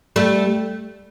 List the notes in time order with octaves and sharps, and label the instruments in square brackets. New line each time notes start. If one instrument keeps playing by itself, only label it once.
[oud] G3 A3